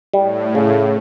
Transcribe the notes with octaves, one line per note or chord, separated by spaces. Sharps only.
A2 G3
C#3